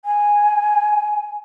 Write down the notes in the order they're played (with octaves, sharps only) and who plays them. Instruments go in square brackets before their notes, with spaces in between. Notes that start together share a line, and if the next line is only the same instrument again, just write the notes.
[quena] G#5